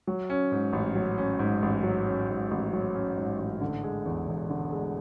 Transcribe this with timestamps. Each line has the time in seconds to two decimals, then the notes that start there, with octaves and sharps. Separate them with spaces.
0.07 F#3
0.30 C#4
0.52 G#2
0.73 A1
0.95 F#3
1.18 C#4
1.39 G#2
1.62 A1
1.83 F#3
2.06 C#4
2.28 G#2
2.51 A1
2.73 F#3
2.95 C#4
3.16 G#2
3.38 A1
3.61 D3
3.84 G#3
4.06 E2
4.27 E1
4.50 D3
4.72 G#3